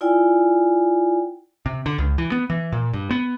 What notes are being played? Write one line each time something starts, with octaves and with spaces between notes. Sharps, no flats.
E4 F4 D5 G5 G#5
C3
D3
C#2
E3
B3
E3
A#2
G2
B3